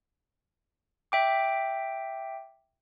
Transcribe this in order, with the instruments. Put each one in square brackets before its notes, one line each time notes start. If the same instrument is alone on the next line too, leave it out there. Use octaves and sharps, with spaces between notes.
[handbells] E5 G5 D6